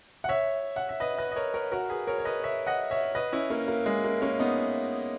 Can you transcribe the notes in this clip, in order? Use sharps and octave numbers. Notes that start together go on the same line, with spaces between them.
F#5
C#5 E5
F#5
E5
B4 D#5
B4 D#5
D#5
A#4 C#5
A#4 C#5
F#4 A#4
G#4 B4
A#4 C#5
C#5
B4 D#5
C#5 E5
D#5 F#5
C#5 E5
B4 D#5
C#4 E4
A#3 C#4
A#3
G#3
A#3
A#3 C#4
B3 D#4